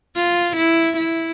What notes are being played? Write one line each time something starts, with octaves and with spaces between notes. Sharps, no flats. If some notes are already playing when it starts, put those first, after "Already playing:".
F4
E4
E4